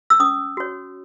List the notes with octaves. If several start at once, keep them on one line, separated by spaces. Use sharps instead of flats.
E6
C#4 D#6
F#4 C#5